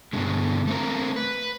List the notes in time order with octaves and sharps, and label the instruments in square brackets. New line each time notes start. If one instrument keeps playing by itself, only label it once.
[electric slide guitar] G2 B2 D3 G#3
A3 C4 A#4
B4